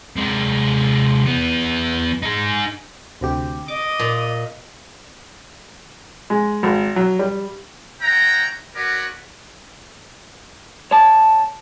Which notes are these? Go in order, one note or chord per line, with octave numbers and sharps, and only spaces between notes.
C3 G#3
E3 B3
D#4 G#4
D2 C3 G4
D#5 D6
A#2
G#3
G#1
F#3
G3
C#5 E5 F#5 G5 A#5
F#4 A#4 B4 C#5 D5 F#5
C#5 A5